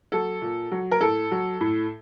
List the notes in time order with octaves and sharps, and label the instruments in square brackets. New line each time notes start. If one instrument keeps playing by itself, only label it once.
[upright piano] F#3 A4
A#2
F#3
A#4
A2 A4
F#3
A2